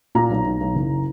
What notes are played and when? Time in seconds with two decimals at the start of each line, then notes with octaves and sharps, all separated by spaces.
0.15 A#2 A#5
0.30 B1
0.45 B1
0.61 B1
0.75 F#1